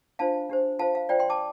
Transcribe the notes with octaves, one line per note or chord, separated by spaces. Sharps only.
D4 F4 C5 F5 A5
D4 G4 C5
F4 C5 F5 A5
F5
F4 C5 D5 G5
G5 C6
A5 D6